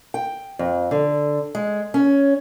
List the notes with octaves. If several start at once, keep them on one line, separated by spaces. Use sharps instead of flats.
G5
F2
D3
G#3
C#4